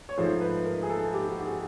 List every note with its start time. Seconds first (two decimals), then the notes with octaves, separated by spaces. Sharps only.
0.09 C#5
0.18 G#2 F3 A3 C5
0.41 B4
0.65 A#4
0.83 G#4
0.89 A4
1.13 G4
1.29 F#4
1.40 G4
1.45 G#4